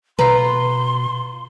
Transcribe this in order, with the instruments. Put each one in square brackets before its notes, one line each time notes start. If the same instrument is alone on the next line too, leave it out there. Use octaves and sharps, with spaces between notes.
[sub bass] B2 [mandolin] F4 A#5 [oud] B4 [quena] C6